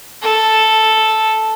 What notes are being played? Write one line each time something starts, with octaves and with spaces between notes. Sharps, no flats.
A4